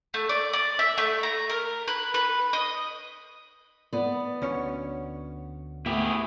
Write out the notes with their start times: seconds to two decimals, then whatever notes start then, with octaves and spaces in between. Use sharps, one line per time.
0.14 A3
0.29 D5
0.53 D5
0.79 E5
0.98 A3
1.23 A#5
1.49 A#4
1.88 B4
2.14 B4
2.53 D#5
3.93 B3 D5
4.42 D2 C#4 C#5
5.86 A3 B3 E4 G4 G#4